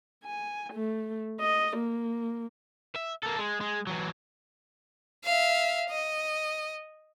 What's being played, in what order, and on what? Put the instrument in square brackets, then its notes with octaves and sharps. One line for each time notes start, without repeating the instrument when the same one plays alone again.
[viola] G#5
A3
D#5
A#3
[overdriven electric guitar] E5
A#3 A4
G#3
G#3
E3 F#3
[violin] E5 F5
D#5